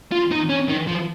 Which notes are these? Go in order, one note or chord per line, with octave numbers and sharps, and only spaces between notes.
F4
D#4
C#4
D#3
F3